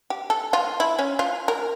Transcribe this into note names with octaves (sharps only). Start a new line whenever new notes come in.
G4
A4
F4
E4
C#4
F4
A#4